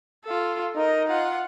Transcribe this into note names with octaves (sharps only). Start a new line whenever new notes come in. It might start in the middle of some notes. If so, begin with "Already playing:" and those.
F4 A4
D#4 A#4 D#5
F4 F#5